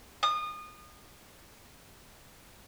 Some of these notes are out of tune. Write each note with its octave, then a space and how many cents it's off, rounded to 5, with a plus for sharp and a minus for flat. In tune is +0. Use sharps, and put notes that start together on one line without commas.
D#6 -30